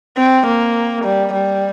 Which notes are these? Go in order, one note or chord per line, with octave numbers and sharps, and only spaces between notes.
C4
A#3
G3
G3